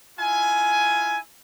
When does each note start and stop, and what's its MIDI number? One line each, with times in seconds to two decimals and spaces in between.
0.19 1.18 64
0.19 1.18 65
0.19 1.18 80